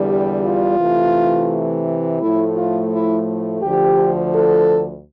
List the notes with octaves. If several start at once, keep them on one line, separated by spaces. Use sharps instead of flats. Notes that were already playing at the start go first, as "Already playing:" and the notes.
Already playing: E2 D3 G3
G4
F4
C3 E3 A3
A2 F3 A3 E4
F4
E4
D2 D3 F3 G4
A4